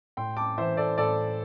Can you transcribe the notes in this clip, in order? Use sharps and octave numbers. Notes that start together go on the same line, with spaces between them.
A2 G5 C6
A5 D6
E3 C5 E5
A4 D5
A2 A4 D5